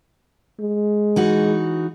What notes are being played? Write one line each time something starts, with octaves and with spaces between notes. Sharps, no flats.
G#3
E3 D#4 F#4